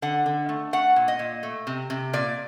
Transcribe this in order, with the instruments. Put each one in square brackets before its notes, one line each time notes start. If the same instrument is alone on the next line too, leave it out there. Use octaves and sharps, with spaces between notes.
[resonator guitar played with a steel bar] D3 F#5
D3
A3
A3 F#5
A#2
D#5
A#2
A3
C3
C3
A#2 D5